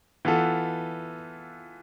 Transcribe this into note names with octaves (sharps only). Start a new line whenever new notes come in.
E3 B3 F4 A4